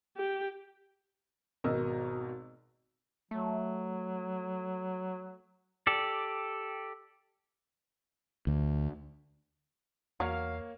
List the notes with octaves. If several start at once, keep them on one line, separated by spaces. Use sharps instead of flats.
G4
G#1 B2 A#4 D#5 E6
F#3 A3
G4 A4 D5
D2
E2 F#3 A#3 C#5 F5